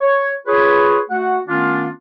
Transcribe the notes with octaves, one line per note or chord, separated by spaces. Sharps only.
C#5
F4 G#4 B4 C#5
A3 F#4 F#5
D#3 A3 B3 C#4 D4 F4